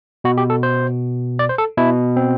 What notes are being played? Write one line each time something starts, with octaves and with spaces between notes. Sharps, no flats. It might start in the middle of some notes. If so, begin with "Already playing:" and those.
B2 F#4
G4
A4
C5
D5
C5
A4
B2 E4
C4